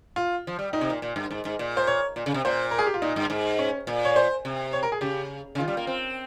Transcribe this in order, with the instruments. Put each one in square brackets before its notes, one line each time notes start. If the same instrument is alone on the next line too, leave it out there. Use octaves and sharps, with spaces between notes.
[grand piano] F4
[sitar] F3
G3
[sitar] A#2 [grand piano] D#4
[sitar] C3
A#2
A#2
G2
G#2
G#2
A#2
[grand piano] C5
C#5
[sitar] A#2
C#3
C3
[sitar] A#2 [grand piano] C5
[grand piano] A#4
G#4
G4
F4
[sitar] A#2 [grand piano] D#4
[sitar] G2
G#2
[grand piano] C#4
[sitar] A#2
[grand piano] C#5
C5
[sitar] C3
[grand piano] C#5
A#4
G#4
[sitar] C#3 [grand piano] G4
[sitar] C#3
[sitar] D#3 [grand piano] F4
[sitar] G3
A#3
C4